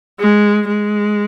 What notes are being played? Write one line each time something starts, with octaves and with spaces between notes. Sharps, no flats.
G#3
G#3